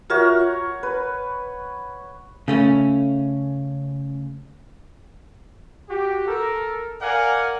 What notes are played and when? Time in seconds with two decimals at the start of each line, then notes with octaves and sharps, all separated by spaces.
0.10 F4 F#4 A#4 C#5 E5 F#5
0.40 C#6
0.83 B4
2.48 C#3 A3 C#4
5.90 F#4 G4
6.27 A4 A#4
7.02 A#4 D5 F5 F#5 G#5